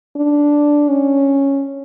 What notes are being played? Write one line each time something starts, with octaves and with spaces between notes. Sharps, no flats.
D4
C#4